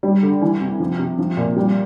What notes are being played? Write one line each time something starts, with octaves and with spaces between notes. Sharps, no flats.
G3
D3
E3
C3
F3
C3
F3
A#2
G3